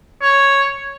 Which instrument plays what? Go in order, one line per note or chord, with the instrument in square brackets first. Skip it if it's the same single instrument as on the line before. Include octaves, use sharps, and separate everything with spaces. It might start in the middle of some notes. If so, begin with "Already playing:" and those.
[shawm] C#5